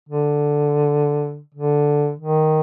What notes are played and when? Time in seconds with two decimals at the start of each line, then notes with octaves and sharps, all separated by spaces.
0.09 D3
1.55 D3
2.20 D#3